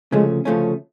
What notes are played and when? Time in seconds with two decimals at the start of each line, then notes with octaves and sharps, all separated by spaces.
0.12 D2 C#3 F3 G#3 A3 C#4
0.45 D2 C#3 F3 A3 C#4